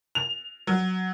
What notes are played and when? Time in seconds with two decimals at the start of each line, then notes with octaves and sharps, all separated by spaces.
0.15 F7
0.67 F#3